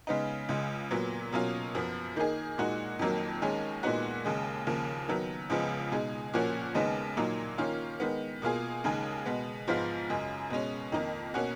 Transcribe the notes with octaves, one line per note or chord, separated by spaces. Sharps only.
C#3 G#3 B3 D#4
C#2 C#3 G#3
A#2 F#3 B3
B2 F#3 A#3 C#4 F4
F#2 F3 B3
D#3 A#3 D#4 G#4
A#2 G#3 D#4 F#4
F2 D#3 F#3 A#3
D#2 D#3 G#3 C#4 G#4
A#2 G#3 B3 D#4 F#4
D#2 C#3 G#3
D#2 C#3 F3 A#3
D#3 F#3 B3
C#2 C#3 F3 G#3 B3
B2 G#3 D#4 G#4
A#2 F3 A#3 C#4 F#4
D#2 C#3 G#3 B3 D#4
A#2 F#3 A#3 D#4
D#3 A#3 C#4 F4
D#3 G#3 B3
B2 A#3 F4 G#4
D#2 C#3 G#3 D#4 G#4
B2 G#3 B3
G#2 F3 G#3 B3 F4
F#2 C#3 G#3
B2 G#3 C#4
F2 D#3 A#3 D#4
B2 A#3 C#4 F#4